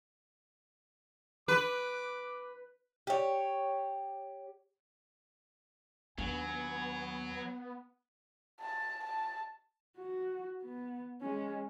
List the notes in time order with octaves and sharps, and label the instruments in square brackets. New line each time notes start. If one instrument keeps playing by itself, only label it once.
[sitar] B4 [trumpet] D6
[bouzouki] G4 C#5
[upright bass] D#2 D4 [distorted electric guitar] F#3 [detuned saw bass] B3 [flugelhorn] G#5
[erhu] A5
A5
[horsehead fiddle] F#4
B3
G#3 C#4